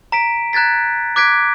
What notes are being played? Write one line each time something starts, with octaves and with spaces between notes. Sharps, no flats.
A#5 B6 D7
A#5 F#6 G#6 A6 B6
D6 F#6 G#6 B6 D7